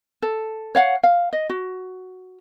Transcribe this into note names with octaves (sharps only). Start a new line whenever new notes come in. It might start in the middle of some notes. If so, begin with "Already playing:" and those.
A4
C#5 F5 F#5
F5
D#5
F#4